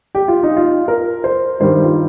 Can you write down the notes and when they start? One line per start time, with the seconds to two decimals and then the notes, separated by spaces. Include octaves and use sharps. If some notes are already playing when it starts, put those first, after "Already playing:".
0.15 G4
0.28 F4
0.43 D#4
0.57 F4
0.88 A#4
1.24 C5
1.60 G2 D#3 G3 C5
1.84 F4